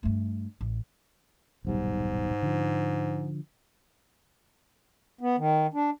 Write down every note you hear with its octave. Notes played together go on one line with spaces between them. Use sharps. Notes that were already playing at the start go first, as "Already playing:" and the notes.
G2 A3
A1
D#1 B1 G#2 G3
D3 F3
B3
D#3
D4